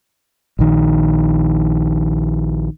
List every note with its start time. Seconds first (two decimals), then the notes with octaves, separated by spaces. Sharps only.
0.59 A#1 D#3